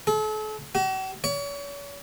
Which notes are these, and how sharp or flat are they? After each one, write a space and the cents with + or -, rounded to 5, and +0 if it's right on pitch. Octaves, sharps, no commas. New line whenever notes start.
A4 -40
F#4 +45
C#5 +40